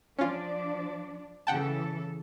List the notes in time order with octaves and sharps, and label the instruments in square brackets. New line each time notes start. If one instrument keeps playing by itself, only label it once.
[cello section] F3 D4 D5 [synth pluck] C#4 F4
[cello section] C#3 E3 A4 [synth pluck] F#5 G5 A5